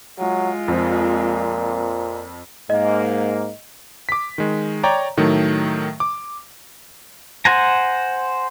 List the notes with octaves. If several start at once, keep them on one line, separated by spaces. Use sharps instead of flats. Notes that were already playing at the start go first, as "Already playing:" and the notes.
F#3 G#3 F4
F2 A#2 C4
G#2 A#3 D#5
D6 B6
D#3 G#3
C#5 D5 G5 A#5
A2 D#3 F#3 A3
D6
C5 F#5 G#5 A#5